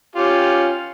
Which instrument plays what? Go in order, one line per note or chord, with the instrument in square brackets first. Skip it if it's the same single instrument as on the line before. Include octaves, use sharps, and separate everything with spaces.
[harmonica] C#4 F4 G4